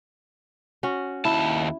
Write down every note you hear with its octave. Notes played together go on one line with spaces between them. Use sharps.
C#4 F#4
D#2 E4 A5